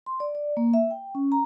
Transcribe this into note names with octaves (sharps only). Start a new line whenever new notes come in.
C6
D5
D5
A#3
E5
G5
C#4
A#5